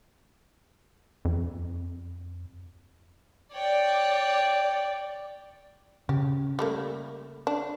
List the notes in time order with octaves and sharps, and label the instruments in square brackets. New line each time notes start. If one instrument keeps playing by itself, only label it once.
[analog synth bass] F2
[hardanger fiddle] C#5 G5 [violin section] D5
[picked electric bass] C#3 [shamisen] G4
[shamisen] G3 A3 A#3
D4